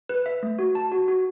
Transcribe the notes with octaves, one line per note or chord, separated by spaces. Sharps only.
B4
E5
A3
F#4
A5
F#4
F#4